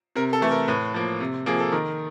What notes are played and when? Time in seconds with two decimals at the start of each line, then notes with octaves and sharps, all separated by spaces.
0.16 C3 A#4
0.33 A4
0.41 E3 A3
0.51 A#4
0.68 A2 B4
0.94 F3 A#3
1.20 C3
1.46 F3 A#3 G#4
1.60 A4
1.72 D#3 A#4